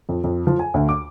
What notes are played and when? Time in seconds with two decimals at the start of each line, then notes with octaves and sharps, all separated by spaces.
0.09 F2
0.24 F2
0.47 F3
0.59 G#5
0.74 D2
0.89 D6